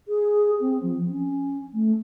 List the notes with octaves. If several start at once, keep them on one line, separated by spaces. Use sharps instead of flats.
G#4
C4
F3
C#4
A3